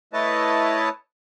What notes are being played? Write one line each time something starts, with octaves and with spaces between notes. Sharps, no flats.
A3 E4 B4 C#5 D#5 A5